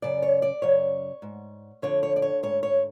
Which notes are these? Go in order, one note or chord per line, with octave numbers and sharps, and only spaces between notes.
F#2 C#3 D5
C#5
D5
F#2 C#3 C#5
G#2
F2 D3 C#5
C#5
D5
C#5
G#2 C#5
C#5